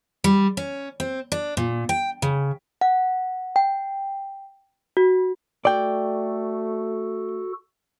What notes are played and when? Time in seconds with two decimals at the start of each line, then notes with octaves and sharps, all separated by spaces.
0.24 G3
0.57 C#4
1.00 C4
1.32 D4
1.57 A#2
1.89 G5
2.22 C#3
2.81 F#5
3.56 G5
4.97 F#4
5.65 A3 F#4 A4 D5 G5